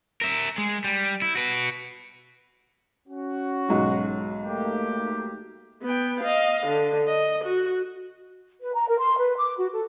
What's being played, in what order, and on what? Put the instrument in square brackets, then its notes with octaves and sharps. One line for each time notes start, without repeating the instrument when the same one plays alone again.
[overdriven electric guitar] A#4 E5
G#3
G3
E4
F#4 B4
[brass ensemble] C#4 F#4
[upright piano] B1 G#2
[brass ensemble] A3 A#3 G4
[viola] B3 G5
D#5 F5
D3
D#5
F#4
[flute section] B4
A#5
A#4
C6
B4
D6
F#4
A4